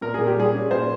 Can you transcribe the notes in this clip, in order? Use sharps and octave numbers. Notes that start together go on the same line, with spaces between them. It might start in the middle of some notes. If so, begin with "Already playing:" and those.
A#2 A#4
A#2 G#4
G4
G3 G#4
C#4
A#2 C5